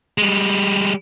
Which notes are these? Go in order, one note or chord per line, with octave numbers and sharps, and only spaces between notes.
G3 G#3